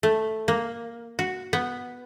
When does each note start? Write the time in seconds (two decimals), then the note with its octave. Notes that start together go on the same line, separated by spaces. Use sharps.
0.03 A3
0.48 A#3
1.19 F#4
1.53 B3